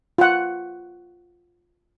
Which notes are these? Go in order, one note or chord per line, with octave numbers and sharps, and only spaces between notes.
F4 F#5